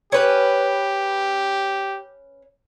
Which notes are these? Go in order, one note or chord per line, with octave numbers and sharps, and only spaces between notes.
C#4 G4 B4